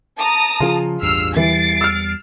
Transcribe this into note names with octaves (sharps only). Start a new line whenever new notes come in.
A5 A#5 D#6
C#3 F3 F4 G#4
A1 E2 G2 E6 F6 C7
E2 E3 G3 A6 C7 D7
E6 F6